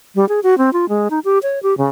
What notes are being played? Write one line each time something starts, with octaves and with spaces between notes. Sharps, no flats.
G3
G#4
F#4
C4
F4
G#3
D#4
G4
C#5
G4
C#3